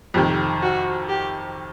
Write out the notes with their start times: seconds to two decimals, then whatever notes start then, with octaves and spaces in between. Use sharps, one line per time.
0.14 F2 C3 D#3 G4
0.62 F#4
1.09 G4